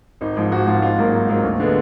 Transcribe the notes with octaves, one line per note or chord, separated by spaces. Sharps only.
G#1 D#4
G#2 F3
G#1 F#4
G#2 F3 F4
G#1 F4
G#2 F#3 A#3
G#1
G#2 F#3 A#3
D2
D3 G#3 B3